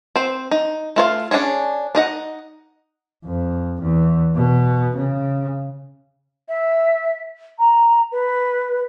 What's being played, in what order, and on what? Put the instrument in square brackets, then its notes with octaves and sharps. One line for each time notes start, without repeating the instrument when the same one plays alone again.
[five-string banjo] C4 C5
D#4
A3 F4 C#5 F5
C#4 D4 E4 G#4 C#5
D4 D#4 D#5 F#5
[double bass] F2
E2
B2
C#3
[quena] E5
A#5
B4